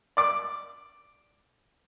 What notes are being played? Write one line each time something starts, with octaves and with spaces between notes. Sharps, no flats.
D5 D6